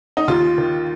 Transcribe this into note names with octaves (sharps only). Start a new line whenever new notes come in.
D#4
D#2 F4
D#3